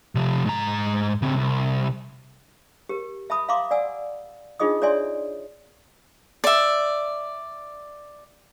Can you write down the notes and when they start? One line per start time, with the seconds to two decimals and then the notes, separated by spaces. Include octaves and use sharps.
0.15 C3 F3
0.46 G#2 A#5
1.22 C#3 C4
1.36 C2
2.89 G4 A#4
3.30 E5 A5 B5 D#6
3.48 E5 F5 A#5 C6 D6
3.71 D5 F#5 G#5 E6
4.60 D4 D#4 F4 G#4 D#5 D#6
4.82 C#5 D5 E5 G#5 C6
6.44 D5 E5